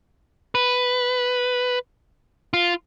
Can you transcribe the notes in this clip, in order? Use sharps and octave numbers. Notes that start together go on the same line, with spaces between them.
B4
F4